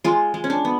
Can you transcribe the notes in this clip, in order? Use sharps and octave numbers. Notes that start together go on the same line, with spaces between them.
G#3 F4
G#3
C#4
D4
B3